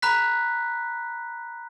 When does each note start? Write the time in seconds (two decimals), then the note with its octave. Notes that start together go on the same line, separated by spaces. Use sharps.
0.02 A#5 B5 F#6 B6